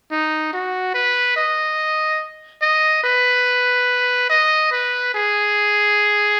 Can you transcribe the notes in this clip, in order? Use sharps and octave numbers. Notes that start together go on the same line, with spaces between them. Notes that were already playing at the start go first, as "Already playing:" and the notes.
D#4
F#4
B4
D#5
D#5
B4
D#5
B4
G#4